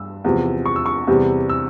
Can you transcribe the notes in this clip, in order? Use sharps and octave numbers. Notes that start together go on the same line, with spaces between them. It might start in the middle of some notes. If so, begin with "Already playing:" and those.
Already playing: G2 E6
E2 C3 F3
C#6
E6
C#6
E2 C3 G3
E6